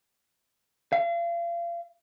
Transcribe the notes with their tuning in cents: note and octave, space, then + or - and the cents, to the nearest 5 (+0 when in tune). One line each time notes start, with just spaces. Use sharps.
F5 -35